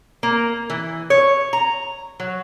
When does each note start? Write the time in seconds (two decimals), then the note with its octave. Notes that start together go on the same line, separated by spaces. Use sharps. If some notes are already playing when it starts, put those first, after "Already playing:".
0.23 A#3
0.70 E3
1.10 C#5
1.53 A#5
2.20 F#3